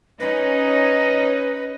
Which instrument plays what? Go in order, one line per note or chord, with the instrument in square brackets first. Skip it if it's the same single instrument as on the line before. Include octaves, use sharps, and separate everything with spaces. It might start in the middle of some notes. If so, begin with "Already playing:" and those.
[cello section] C#4 D#4 D#5 [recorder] B4